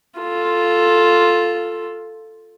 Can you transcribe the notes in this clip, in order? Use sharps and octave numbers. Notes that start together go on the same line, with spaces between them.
F4 A4